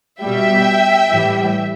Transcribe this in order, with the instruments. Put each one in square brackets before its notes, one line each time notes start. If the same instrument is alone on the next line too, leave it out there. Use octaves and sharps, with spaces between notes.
[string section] B2 G3 E5 G5
A2 E3 G3